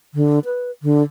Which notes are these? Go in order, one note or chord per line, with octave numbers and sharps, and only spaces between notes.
D3
B4
D3